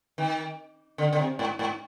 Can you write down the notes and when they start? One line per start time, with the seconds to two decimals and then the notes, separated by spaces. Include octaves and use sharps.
0.18 D#3
0.98 D3
1.13 D3
1.19 C3
1.39 G#2
1.59 G#2